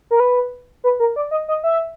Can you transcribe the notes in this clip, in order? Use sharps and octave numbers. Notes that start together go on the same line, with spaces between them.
A#4
B4
B4
A#4
D5
D#5
D#5
E5